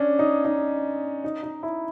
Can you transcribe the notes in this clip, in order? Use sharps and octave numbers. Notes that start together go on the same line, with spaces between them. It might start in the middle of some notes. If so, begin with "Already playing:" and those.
Already playing: C#4 D4
D#4
D#4
D#4
D#4
E4